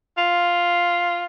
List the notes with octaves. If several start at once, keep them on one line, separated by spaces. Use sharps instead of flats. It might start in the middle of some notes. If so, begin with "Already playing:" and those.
F4